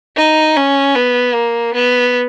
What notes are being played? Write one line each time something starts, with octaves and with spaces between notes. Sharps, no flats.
D#4
C#4
B3
A#3
B3